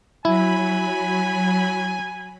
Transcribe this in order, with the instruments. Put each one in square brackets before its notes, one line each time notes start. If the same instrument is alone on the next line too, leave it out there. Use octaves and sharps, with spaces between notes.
[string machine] F#3 B5 [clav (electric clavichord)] E4 [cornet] G#5